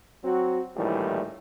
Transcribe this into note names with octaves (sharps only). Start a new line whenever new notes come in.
F#3 C4 F#4
A#1 A2 D#3 E3 G3